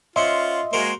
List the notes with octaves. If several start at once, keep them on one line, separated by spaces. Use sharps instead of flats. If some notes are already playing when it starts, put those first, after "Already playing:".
C#4 F4 C5 D#5 E5 F#5 C6
G#3 A#3 F#4 A#4 C5